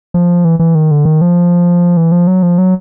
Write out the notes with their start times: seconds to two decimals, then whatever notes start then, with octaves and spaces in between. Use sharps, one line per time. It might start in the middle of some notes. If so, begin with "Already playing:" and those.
0.14 F3
0.45 E3
0.59 E3
0.75 D#3
0.91 D3
1.05 D#3
1.21 F3
1.97 E3
2.12 F3
2.27 F#3
2.43 F3
2.58 F#3